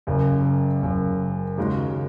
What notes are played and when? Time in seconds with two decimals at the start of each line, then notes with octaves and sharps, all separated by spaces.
0.07 F#1 F#2 C#3
0.82 F#1 F#2 C#3
1.57 D#2 C#3 G#3 C#4 F#4